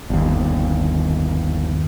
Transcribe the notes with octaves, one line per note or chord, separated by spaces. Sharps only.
G1 D#2